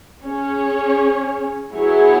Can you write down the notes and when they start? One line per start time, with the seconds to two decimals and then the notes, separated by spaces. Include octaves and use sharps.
0.24 C#4 G#4 C#5
1.74 F#3 B3 E4 G#4 C#5